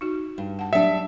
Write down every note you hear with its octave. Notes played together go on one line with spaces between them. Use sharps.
D#4 F#4
G2
F#5 A5
F#3 G3 D4 E5 G5